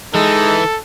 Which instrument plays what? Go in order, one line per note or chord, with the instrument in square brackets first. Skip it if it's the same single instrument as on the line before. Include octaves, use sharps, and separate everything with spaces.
[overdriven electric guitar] E3 [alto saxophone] G#3 [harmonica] D#4 [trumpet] A4